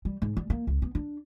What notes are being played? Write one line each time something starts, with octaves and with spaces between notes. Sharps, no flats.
G3
G#2
G3
A#3
C#2
B3
D4